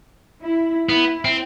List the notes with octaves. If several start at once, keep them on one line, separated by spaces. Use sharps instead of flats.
E4
B3 E4
C4